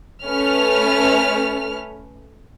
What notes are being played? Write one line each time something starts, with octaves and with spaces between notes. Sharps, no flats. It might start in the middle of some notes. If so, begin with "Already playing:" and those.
A3 C#4 B4 F6